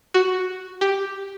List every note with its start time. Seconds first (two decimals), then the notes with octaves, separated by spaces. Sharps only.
0.14 F#4
0.81 G4